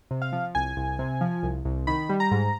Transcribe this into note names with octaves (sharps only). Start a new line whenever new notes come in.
C3
F5
F3
C2 G#5
C2
C3
F3
C2
C2
D#3 B5
G3
A#5
G#2